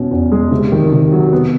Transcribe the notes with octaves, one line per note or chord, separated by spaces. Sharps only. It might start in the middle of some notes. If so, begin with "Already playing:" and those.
Already playing: B2 C#4
E2
G#3
C3
D#3
C3
F#3
B3